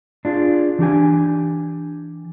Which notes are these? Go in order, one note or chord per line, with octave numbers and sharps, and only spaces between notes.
D4 F4 G#4
E3 D4 G4 G#5